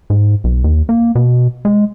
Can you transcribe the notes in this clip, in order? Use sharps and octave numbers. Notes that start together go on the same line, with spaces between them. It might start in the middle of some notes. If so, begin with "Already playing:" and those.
G#2
B1
D#2
A#3
B2
G#3